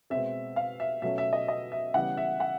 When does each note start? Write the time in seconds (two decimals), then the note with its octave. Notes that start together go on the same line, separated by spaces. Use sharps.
0.10 B2 G#3 C4 E5
0.56 F5
0.80 E5
1.02 B2 F#3 A3 C#4 E5
1.18 E5
1.33 D#5
1.48 D#5
1.72 E5
1.94 C#3 E3 G3 B3 F#5
2.17 E5
2.40 F#5